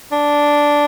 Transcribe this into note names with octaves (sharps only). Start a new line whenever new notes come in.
D4